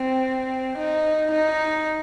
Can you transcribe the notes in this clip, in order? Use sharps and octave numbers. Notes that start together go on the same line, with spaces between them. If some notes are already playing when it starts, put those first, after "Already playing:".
Already playing: C4
D#4
D#4